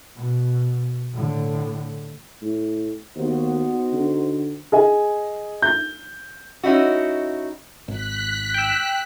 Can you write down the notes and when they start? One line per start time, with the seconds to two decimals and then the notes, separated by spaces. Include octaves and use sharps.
0.16 B2
1.12 A2 D3
2.42 A2
3.16 D#2 B3 D#4 F#4 C5
3.93 D3
4.72 G#4 D#5 G#5
5.62 G6
6.63 C#4 D#4 E4 F#4
7.88 G#1 F#6 B6
8.54 G5 E6